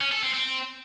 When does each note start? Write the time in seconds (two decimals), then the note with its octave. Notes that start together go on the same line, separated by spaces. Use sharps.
0.01 C#4
0.12 A4
0.23 C4
0.34 C4